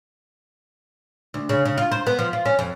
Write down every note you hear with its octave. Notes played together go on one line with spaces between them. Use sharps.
D2
C#3
C#3
F4
C5
B3
F3
F4
C#4
F2